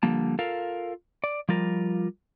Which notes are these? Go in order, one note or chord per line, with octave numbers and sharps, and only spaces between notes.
D3 F3 G3 A#3 A5
F4 A4 A#4 F5
D5
F3 G3 F4 A#4